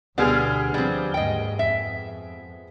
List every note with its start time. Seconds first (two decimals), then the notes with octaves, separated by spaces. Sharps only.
0.18 D2 B2 D3 G3 B3 G#4 F6
0.74 D3 F3 G3 C4
1.14 D#2 G#2 D#5 G5
1.59 F2 E5